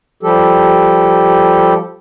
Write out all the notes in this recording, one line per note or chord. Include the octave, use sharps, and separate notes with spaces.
F3 G3 G4 A4